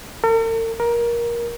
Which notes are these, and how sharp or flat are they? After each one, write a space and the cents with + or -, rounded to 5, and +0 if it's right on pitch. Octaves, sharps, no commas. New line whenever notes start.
A#4 -45
A#4 +20